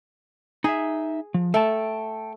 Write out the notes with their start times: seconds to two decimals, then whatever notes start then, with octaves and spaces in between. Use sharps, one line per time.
0.64 D#4 G#4 E5
1.34 F3
1.54 A3 A4 G5 A5